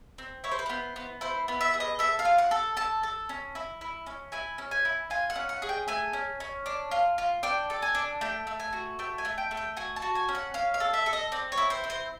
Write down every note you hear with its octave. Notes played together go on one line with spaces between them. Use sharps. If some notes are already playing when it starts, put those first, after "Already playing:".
C4
E4 C#5
C5
B4
B3 C5
B3
E4 C5
B3
E5
G#4
D#5
A4 E5
F5
F4
F#5
A4
A4 A5
A4
C#4
E4
E4
C#4
E4 G#5
C#4
G#5
E4
F4 G#5
F#5
C#4
F#5
G#4
G5
A3 G#5
C#4
C#4
D4
F4
F4
D4 G5
A4
G#5
D4
A3 G5
A3
G#5
F#4
A3 G5
G#5
A3
G5
A3
G5
F#4 G#5
A5
F#4
G#5
C#4
F#5
C#4 F5
F5
A4
E5
A4
D#5
C4 D5
C#5
E4
C5
C4
C5